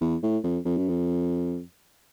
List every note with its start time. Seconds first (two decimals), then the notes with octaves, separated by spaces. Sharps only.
0.01 E2
0.23 A2
0.44 F2
0.65 F2
0.77 F#2
0.89 F2